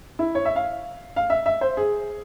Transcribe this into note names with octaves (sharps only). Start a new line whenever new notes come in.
E4
C#5
E5
F5
F5
E5
E5
C5
G#4